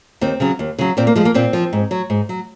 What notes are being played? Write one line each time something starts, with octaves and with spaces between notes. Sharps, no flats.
D#2 C4
C#3 F#3
D#2
C#3 F#3
A#2 C4
A#3
F3 G#3
A#3
A#2 C4
F3
G#2
F#3
G#2
F#3